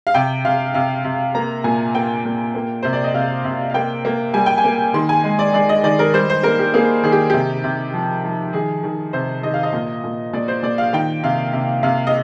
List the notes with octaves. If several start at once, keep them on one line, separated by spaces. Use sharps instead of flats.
F5
C3 G5
C3 F5
C3 F5
C3
A#3 A#5
A#2 G#5
A#3 G5
A#2
A#3
C3 C5
D5
D#5
C3 F5
C3
F5
A#3 G5
A#3
G3 G#5
G5
G#5
A#3
D#3 C6
G#5
G#3
D5
G#3 D5
D#5
D#3 D5
A#4
G3 C5
C5
A#3 A#4
G4
A#3 G#4
D#3 G#4
G4
C3 G4
C3
F3
F3
D#3 G#4
D#3
C3 C5
D#3 D#5
F5
D#5
A#2
A#2
A#2 D5
C5
A#2 D5
F5
D#3 G5
C3 F5
C3
C3 F5
D#5